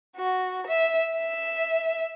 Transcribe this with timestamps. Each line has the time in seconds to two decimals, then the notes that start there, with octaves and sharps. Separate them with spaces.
0.17 F#4
0.67 E5
1.17 E5